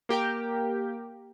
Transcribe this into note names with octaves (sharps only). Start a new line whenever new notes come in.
A#3 G4 A#4 G5